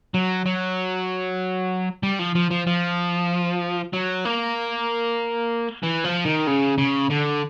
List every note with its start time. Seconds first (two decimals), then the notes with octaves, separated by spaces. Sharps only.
0.14 F#3
0.46 F#3
2.03 G3
2.19 F3
2.35 F3
2.51 F3
2.67 F3
3.94 F#3
4.25 A#3
5.83 E3
6.04 F3
6.25 D#3
6.47 C#3
6.78 C#3
7.10 D3